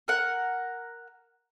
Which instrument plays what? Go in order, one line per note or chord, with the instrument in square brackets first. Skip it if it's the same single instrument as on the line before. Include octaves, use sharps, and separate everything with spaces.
[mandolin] A#4 F#5